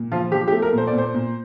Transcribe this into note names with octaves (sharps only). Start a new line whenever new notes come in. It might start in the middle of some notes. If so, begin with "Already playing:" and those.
Already playing: A#2
F3 F4
F3 G4
G4
A3
A#4
A#2
C5
D5
A#2
C5
A#2